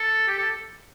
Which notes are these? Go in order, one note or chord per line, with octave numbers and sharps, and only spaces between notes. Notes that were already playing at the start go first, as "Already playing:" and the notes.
Already playing: A4
G4
A4